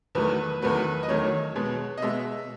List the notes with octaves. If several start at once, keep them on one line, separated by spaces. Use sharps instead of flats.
E2 D#3 F#3 A3 B4
E2 D#3 F#3 A3 B4
D#5
E2 D#3 F#3 A3 C#5
B2 G#3 B3
D#5
B2 G#3 B3 E5